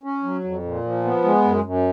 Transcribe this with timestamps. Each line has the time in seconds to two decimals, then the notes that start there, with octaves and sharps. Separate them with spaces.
0.03 C#4
0.23 F#3
0.44 F2
0.63 A#2
0.84 F3
1.04 B3
1.24 G#3
1.44 F#2
1.64 F#2